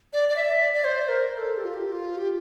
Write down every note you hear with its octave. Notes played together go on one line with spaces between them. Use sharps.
D5
D5
E5
D5
D5
C5
A#4
A#4
A4
G4
F4
G4
F4
G4